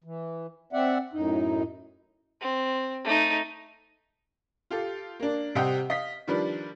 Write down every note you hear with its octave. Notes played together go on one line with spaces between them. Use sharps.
E3
C4 D5 E5 F#5
F#2 A2 D#4
C4
A3 D#4
F4 G4 A4
A#3 D4
C3 G3 C4 D#5 F#5 G5
D#5 F5 B6
D#3 F3 G3 D4 B4